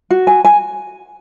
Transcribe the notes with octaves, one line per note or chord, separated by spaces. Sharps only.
F#4
G#5
G#5